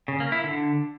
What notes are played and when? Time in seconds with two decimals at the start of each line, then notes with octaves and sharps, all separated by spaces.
0.08 C#3
0.20 A#3
0.32 E4
0.44 D3